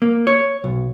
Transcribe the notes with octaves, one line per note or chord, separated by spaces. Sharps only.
A#3
C#5
B1